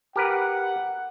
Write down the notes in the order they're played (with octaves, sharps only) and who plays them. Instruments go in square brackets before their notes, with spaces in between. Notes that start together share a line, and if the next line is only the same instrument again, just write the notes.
[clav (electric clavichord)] G4 A#4 B4 [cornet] F#5